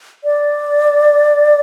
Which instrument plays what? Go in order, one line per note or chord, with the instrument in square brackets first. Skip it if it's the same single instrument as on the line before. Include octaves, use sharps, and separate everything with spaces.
[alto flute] D5